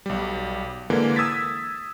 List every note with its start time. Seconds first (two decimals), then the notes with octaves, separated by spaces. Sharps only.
0.06 B1 G3
0.90 D3 E3 G#3 A#3
1.16 D#6 E6 G#6 A6 B6